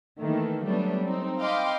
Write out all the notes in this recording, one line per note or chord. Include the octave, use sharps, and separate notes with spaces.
D#3 E3 A3 A#3
F#3 G3 A3 B3 D4
C4 D#4
D#5 F5 G5 B5 C6 D6